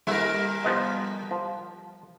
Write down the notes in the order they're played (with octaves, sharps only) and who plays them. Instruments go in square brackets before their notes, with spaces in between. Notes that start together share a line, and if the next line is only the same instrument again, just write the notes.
[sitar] G3 A#4 [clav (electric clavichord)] E4
[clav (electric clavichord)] F3 B3 D#5
F3